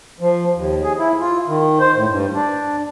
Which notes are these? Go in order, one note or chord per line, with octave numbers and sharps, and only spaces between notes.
F3
D#2
G#4
E4
F4
D#3
C5
A2
G2
D4